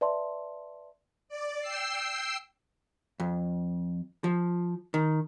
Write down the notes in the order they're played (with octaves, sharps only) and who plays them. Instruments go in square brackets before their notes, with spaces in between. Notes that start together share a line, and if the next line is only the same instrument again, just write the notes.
[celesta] B4 D5 E5 A5 C6
[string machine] D5
G5 E6 C7
[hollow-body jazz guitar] F2
F3
D#3